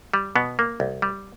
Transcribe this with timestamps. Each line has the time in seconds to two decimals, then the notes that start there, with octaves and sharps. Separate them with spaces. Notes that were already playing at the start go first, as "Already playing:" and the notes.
0.14 G3
0.36 B2 B3
0.59 A#3
0.80 C2
1.02 G3